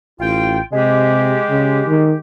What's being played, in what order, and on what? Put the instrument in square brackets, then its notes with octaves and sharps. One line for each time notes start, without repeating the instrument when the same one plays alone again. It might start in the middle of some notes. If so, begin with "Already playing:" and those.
[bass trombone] A1 [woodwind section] F4 G5
[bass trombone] C3 [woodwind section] G#3 G4
[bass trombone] C#3
D#3